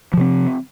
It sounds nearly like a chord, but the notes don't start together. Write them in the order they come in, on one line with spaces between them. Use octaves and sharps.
F3 C3 C4